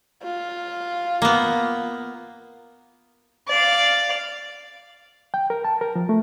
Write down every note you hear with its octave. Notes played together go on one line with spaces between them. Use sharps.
F4
A#3 B3
D5 F5
G5
A#4
A5
A#4
F3
A3